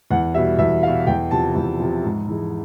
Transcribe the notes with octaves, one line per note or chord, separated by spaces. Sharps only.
E2 F#5
B2 G3 E5
E2 E5
B2 G3 F5
E2 G5
C3 F3 A5
E2
C3 F3
G#2
E3 G#3